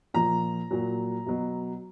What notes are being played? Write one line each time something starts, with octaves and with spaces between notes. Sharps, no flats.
A#2 F3 A#5
A#2 F#3
B2 F#3